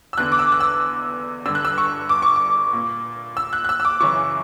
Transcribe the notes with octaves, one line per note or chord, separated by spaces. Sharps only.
E6
E2 D3 F#6
D6
E6
F#6
E6
G2 D3 E6
F#6
E6
C#6
D6
C#6
D6
A#2
E6
F#6
F#6
E6
E6
D6
F#2 C#3 E3 C#6